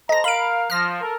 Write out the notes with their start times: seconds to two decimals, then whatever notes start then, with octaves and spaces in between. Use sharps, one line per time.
0.09 A4 C5 D#5 A#5 A#6
0.24 A#4 F5 B5 D7
0.70 F3 F6 A#6
1.01 A4 A#4